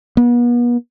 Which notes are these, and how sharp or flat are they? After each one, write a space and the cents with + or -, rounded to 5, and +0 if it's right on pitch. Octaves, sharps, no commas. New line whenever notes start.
B3 -40